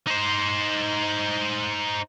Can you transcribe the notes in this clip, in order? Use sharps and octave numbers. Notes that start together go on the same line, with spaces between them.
D#4 C5